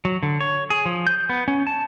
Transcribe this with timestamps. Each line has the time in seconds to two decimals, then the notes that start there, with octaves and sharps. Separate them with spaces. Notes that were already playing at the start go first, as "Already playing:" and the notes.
0.05 F#3
0.23 D3
0.41 C#5
0.70 G#4
0.86 F3
1.07 G6
1.29 B3
1.48 C#4
1.67 A5